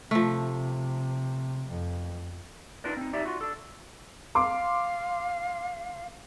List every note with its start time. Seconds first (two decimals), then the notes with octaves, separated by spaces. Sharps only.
0.11 C3 F3 A3
1.70 F2
2.84 D4 D#4 F4 A#4 B4 D5
2.97 C4 D#4
3.13 D#4 G4 D5 E5
3.26 F4 F#4
3.41 D4 A4
4.35 F5 C6 D6